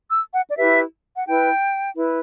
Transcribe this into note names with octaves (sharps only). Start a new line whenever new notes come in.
E6
F#5
D5
E4 G4 B4 E5
F#5
E4 B4 G5
E4 B4